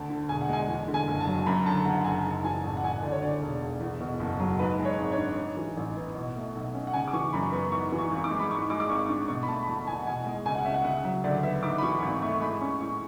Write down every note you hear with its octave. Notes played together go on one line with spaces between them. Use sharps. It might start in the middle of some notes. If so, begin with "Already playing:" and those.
Already playing: D2 A5
D3
E1 G#5
F#5
G#3 G#5
E2
D3
G#5
F#1
A5
F#3
F#2 B5
D3 A5
F#1 F#5
F#1 G#5
G#2 A5
E3 G#5
A5
A1
F#5
A1 G#5
F#5
D2 D5
C#5
D3 D5
E1
E1
E2
B2
F#1
F#3
G#2 B4
G#3
C#5
G#1
C#5
D4
G#2
E3
A1
B3
B2
A3
B1
C#4
F#5
C#3 G#5
D6
E3 C#6
F#2 B5
B3 C#6
G#2 C#6
E3
C#6
G#1
D6
G#3
B5
G#2 C#6
G#3 D6
D6
G#1 C#6
D4 C#6
B2 C#6
B5
A3 A5
B5
E2 A5
E2 G#5
F#5
B2 G#5
G#3
C#2 G#5
F#5
C#4 E5
F#5
C#3 F#5
F#3 E5
D2 D5
B3 E5
G#2 D6
B5
E3 C#6
G#1
A3 C#6
G#3 B5
C#4 C#6
A2 C#6